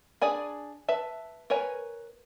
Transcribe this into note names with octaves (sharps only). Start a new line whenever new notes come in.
D4 G#4 D5 G#5 B5
B4 E5 A5
A#4 B4 C#5 G#5